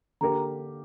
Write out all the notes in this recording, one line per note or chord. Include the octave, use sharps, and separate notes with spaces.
D3 A#3 G4 A#4 A#5